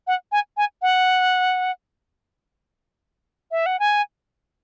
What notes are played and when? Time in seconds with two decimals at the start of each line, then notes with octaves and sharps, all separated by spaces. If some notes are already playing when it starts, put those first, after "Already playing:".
0.07 F#5
0.32 G#5
0.57 G#5
0.82 F#5
3.51 E5
3.66 F#5
3.79 G#5